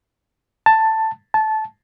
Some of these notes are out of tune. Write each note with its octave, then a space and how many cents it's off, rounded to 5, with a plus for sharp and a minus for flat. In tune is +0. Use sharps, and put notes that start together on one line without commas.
A5 +10
A5 -15